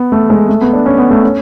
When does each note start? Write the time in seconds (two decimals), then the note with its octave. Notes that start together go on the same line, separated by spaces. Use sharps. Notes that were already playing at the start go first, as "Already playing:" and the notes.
Already playing: B3
0.12 A3
0.30 G#3
0.49 A3
0.61 B3
0.73 D4
0.86 C#4
0.98 B3
1.11 A3
1.23 C#4